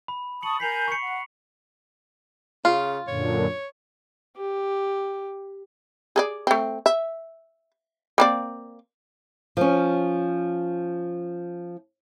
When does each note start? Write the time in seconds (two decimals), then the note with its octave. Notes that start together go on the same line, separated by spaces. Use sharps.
0.08 B5
0.43 A5 C#6 D#6 C#7 F#7
0.60 A#4 G#5 G6 B6 C7 F7
0.88 C#6 C#7
1.02 F#5
2.65 C#3 F4
3.08 F#2 A#2 D3 C#5
4.37 G4
6.16 G#4 A4 D5
6.47 A3 C4
6.86 E5
8.18 A#3 C4 D5
9.57 F3 C#4